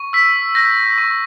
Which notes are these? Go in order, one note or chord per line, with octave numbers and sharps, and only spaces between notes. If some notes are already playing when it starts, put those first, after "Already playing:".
Already playing: C#6
E6 B6
G6 A#6
C#6